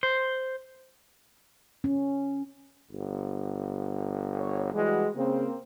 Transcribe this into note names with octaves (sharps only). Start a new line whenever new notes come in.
C5
C#4
G1
C#5
E3 G3 G#3 F#4
C#3 A#3 C4